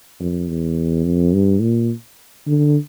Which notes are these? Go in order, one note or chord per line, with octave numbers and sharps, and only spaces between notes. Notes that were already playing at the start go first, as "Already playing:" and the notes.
F2
E2
F2
G2
A#2
D3